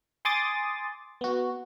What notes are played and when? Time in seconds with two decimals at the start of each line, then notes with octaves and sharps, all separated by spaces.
0.25 G#5 C6 D6 D#6 A6
1.21 B3 F#4